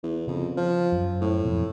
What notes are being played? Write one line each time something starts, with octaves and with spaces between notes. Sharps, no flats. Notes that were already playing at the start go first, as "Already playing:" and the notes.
E2
F2 C#3
F3
F#2
A2
F2 B2